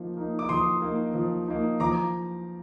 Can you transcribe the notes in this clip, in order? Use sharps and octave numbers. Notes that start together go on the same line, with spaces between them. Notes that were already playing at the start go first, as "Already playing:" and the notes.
Already playing: F3 A#3 D#4
A#3 D#4
D6
F3 C6 D#6
A#3 D#4
F3
A#3 D#4
F3 A#5 D6